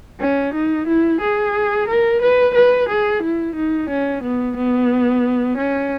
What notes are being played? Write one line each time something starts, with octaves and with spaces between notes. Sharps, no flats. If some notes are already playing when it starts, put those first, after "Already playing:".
C#4
D#4
E4
G#4
A#4
B4
B4
G#4
E4
D#4
C#4
B3
B3
C#4